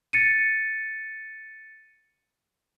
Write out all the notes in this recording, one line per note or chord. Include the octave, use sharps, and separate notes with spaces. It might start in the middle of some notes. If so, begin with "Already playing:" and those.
A6 C#7 D#7